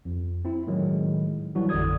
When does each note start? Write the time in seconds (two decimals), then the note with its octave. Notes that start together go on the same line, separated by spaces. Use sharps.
0.05 F2
0.45 C4 E4
0.67 A2 D#3 F#3 G#3
1.55 E3 F#3 G3 D4 E4 F#4
1.69 A1 F2 D3 D5 D#6 G#6